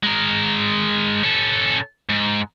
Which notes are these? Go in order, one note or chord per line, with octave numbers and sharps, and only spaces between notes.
G#3 A#4
C#4 A4
G#2